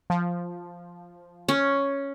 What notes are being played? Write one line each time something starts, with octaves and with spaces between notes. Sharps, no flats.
F3
C#4